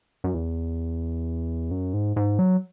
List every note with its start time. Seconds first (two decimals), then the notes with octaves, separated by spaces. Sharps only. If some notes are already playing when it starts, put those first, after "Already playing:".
0.24 F#2
0.34 E2
1.71 F#2
1.93 G#2
2.16 G#2
2.39 F#3